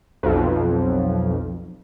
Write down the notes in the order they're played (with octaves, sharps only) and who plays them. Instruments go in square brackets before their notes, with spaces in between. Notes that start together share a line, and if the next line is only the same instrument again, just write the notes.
[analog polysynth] B1 F2